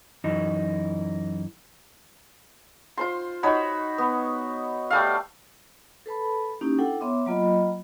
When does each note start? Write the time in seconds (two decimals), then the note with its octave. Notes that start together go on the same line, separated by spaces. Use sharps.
0.24 F#2 E3 D#4
2.97 F4 C5 C6
3.43 D#4 F#4 C#5 B5
3.98 B3
4.90 G3 A3 F5
6.06 A4 B4 A5 B5
6.61 A#3 C#4 D#4 E4 G4
6.78 D4 E4 A4 F#5 G5
7.01 B3 C#5 E5 C6 D6
7.26 F#3 A#3 F4 D#5 B5